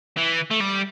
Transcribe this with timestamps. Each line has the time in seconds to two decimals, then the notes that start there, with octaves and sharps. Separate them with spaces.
0.18 E3
0.51 A3
0.61 G3